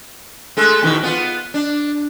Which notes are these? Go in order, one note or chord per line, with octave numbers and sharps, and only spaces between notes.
G#3 A3 A4
E2 B2 D#3
B3 F4
D4